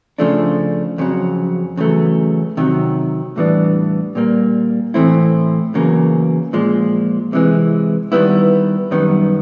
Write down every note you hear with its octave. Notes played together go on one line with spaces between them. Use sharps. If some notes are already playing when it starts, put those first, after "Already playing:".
C#3 F3 A3 D4
F2 C#3 F#3
E2 C#3 F#3 A3
C3 D#3 F#3
A2 E3 G3 B3 D4
A#2 G3 A#3
A2 E3 A3 C4 E4
E2 C#3 F#3 A#3
A#2 F3 G#3
C3 E3 G#3
D#3 G3 B3 E4
F#2 D#3 G3 B3